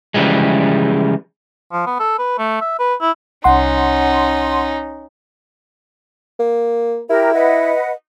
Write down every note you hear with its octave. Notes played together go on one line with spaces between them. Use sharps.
C#3 E3 F3 G3 G#3
F3
B3
A4
B4
A3
E5
B4
E4
C2 C#4 D#4 F#5 C6
A#3
E4 G4 A#4
B4 D#5 F#5